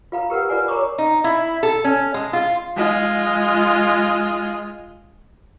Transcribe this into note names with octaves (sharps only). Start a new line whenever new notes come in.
F4 F5 A#5
G4 A#4 B4 F#5
F4 A#4 B4 D5 F#5 G#5
G#4 A#4 C#5 A#5 C#6 D6
D#4
E4
A4
C#4
G#3
F4
G#3 F4